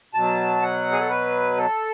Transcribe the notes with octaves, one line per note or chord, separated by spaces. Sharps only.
B2 F#3 A5
F#5
G#4
A4
B4
A4